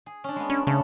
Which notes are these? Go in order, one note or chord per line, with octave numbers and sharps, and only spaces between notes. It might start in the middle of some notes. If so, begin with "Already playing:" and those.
G#4
C#4 D4
G#3 B3
C#4 D4
C#3 A3 C#4 D4